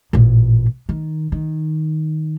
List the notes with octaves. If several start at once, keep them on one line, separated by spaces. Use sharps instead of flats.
A1 A#2
D#3
D#3